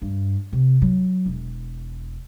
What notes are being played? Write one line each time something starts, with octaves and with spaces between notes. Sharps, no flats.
G2
C3
F#3
E1